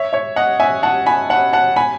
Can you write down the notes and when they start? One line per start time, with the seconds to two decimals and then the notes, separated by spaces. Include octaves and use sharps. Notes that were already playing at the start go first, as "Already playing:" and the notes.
Already playing: C#5 E5
0.13 C#5 E5
0.36 D#5 F#5
0.60 E5 G#5
0.83 F#5 A5
1.06 G#5 B5
1.30 F#5 A5
1.53 F#5 A5
1.76 G#5 B5